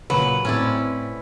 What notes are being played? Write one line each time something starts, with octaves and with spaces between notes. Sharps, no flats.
A#2 C#3 F#3 B4
A2 C4 C#4 E4 D5